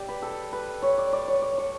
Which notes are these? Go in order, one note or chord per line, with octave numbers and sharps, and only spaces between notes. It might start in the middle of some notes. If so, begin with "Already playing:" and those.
Already playing: G4 D5
B4
A4
B4
C#5
D5
D5
C#5
D5
C#5